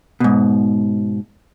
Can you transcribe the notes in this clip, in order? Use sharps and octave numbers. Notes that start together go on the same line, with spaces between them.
G#2 B2